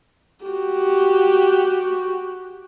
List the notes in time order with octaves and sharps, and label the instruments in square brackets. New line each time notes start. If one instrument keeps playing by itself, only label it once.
[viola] F#4 G4